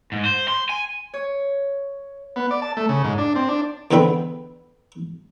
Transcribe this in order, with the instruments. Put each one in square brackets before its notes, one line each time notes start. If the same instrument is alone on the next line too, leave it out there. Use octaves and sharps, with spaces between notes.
[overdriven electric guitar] G#2
C5
C6
G#5
[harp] C#5
[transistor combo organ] B3
D5
A5
A3
C#3
G#2
D4
C4
D4
[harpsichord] E2 D3 B3 C4 G5 B5